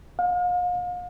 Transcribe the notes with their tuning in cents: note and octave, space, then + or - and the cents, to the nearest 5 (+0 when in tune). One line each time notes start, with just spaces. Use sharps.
F5 +40